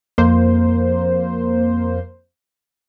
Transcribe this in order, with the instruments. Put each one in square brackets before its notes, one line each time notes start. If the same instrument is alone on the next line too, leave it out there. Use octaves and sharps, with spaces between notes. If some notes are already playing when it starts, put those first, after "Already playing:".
[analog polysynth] F2 A#3 C5